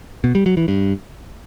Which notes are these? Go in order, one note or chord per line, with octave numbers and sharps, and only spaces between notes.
B2
G3
F#3
E3
G2